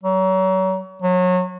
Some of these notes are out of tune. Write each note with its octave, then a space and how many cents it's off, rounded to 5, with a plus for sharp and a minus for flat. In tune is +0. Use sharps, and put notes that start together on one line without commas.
F#3 +35
F#3 -30